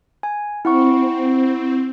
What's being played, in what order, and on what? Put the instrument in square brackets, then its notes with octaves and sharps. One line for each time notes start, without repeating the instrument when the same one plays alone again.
[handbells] G#5
[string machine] C4 [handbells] E4 F#5 C#6